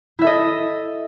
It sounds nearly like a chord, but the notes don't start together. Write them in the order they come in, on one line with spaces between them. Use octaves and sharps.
E4 E5 A4 D#5